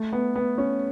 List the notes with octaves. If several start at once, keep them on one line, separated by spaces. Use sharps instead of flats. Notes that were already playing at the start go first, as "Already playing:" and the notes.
Already playing: A3
B3
B3
C#4